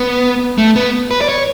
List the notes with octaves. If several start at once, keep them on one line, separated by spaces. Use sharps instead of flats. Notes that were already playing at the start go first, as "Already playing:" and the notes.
Already playing: B3
A3
B3
B4
D5
C#5